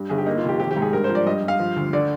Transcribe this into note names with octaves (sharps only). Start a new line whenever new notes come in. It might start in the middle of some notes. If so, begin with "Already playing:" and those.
Already playing: G2
G1 G#4
G4
A#3 D#4
F4
F1
G4
G#1 G4
G4
G#2
G#4
G2 A#4
F3 C5
D5
G2 D#5
G2
F5
F3
D2
D3 D5